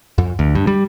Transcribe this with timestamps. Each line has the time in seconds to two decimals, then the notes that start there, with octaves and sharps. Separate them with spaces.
0.18 F2
0.39 D2
0.55 G2
0.67 G3